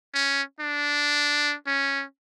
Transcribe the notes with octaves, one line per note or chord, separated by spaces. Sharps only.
C#4
D4
C#4